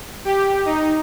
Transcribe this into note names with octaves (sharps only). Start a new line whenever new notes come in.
G4
D#4